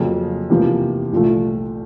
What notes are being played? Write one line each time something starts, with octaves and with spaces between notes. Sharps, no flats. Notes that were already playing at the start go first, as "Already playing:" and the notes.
Already playing: F2 C#3 F#3 A#3
E2 C3 F3 A#3
C2 A#2 F3 A3